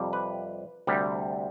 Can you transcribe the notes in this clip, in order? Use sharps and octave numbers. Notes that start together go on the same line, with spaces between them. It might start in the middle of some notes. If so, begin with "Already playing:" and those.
Already playing: F2 C3 G3
B4
D2 C3 G3